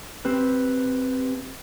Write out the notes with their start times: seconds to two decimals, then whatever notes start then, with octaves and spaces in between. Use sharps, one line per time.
0.25 C4 G4 B4